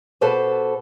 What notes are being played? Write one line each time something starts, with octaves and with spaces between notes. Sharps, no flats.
B2 G4 A4 B4 C5 A5